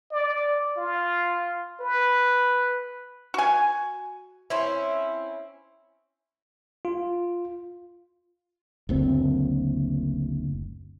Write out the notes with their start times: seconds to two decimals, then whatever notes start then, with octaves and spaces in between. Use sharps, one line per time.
0.11 D5
0.77 F4
1.80 B4
3.34 F#4 G#5
4.50 C4 C#4 E4
6.85 F4
8.89 F#1 D2 C4